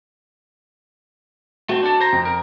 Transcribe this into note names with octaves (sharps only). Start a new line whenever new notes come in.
A3 C4 F#4
D4 A4
C5 A#5
F2
A#4